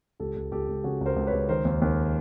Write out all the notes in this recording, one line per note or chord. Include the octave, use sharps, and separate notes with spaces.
C#2 G4 A4
C#2
C#2 G4 A4
C#2
C#3 F#4 G#4
C#2
A#4 C5
C#2
B4 C#5
C#2
D#3 A#4 C5
D#2
D#2